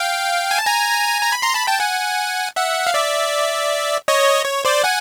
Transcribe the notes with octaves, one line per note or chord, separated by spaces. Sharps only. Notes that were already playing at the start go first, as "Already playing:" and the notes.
Already playing: F5 G5
G#5
A5
G#5 A#5
A#5
B5
A#5 C6
A5 B5
G5 A5
F#5 G#5
E5 F#5
F5
D5 E5
C#5 D#5
C#5
C5 D5
F#5 G#5